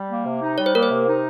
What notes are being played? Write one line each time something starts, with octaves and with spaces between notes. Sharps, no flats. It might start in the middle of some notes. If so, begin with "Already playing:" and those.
Already playing: G3
A#3
C3
D#4
G3 C#5
C5
A#3 A#4
C5
C3
D#4